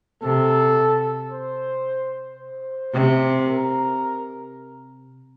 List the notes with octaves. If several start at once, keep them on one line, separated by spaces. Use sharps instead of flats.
C3 A4
C5
C5
C3
A#4